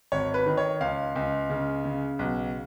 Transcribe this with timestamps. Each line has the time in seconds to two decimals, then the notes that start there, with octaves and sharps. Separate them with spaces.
0.12 G#1 C#5
0.34 B4
0.46 D#3
0.57 C#5
0.81 C#2 F5
1.16 C#2
1.50 C#3
1.85 C#3
2.19 B1